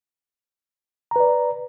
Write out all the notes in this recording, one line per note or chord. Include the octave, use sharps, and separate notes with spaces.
B4 D5 A#5